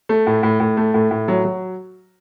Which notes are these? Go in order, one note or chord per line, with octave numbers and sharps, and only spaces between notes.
A3
A2
A2
A2
A3
A2
A2
F#3
F#3